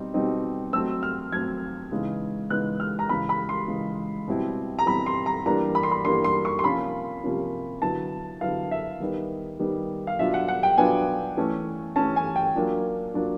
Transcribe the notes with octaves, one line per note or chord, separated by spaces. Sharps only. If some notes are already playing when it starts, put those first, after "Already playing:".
Already playing: B2 G3 C4 D#4
B2 G3 C4 D#4
F#3 A3 C4 E6
F6
F#3 A3 C4 G#6
C#3 E3 G#3 B3 D#4
C#3 E3 G#3 B3 D#4 F#6
F6
A#5
C#3 E3 G#3 B5
B5
C6
C#3 E3 G#3
B2 G3 C4 E4
A#5
B2 G3 C4 E4 B5
C6
A#5
E3 G3 A#3 D4 A#5
B5
C6
B5
E3 G3 A#3 D4 C6
C6
C#6
C6
C3 F3 A#3 C#4 F4 B5
C3 F3 A#3 C#4 F4
D3 F#3 B3 E4 A5
D3 F#3 B3 E4 F5
E5
D#3 G3 B3 D#4
D#3 G3 B3 D#4
F5
B2 F#3 B3 D4 F4 E5
F#5
F#5
G5
B2 F#3 B3 D4 F4 G#5
E3 A3 C#4
E3 A3 C#4 A5
G#5
G5
F#3 A#3 D4 F4
F#3 A#3 D4 F4